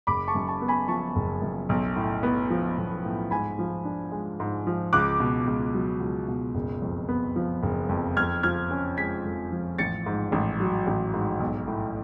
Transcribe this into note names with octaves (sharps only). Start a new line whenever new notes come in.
F#1 B5 D6
A5 C#6
F#2
A5 C#6
B3
G#5 B5
F3 A5 C#6
F#1
F#2
B1
A2
B3
F3
B1
A2
G#2 G#5 B5
F3
D4
G#3
G#2
F3
C#2 D6 F#6
B2
C#2
F#3
C#2
B2
F#1
F2
B3
F3
F#1
F2
F2 F6 G#6
F3 F6 G#6
C#4
G#3 G#6 B6
F2
F3
A1 A6 C#7
G#2
A1
F#3
A1
G#2
B1
A2